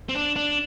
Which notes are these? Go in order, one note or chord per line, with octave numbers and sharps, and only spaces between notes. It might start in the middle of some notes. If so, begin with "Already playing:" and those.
C4
D4
D4